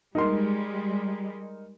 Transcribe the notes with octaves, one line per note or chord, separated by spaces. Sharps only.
G3 G#3 D#4 A#4 C6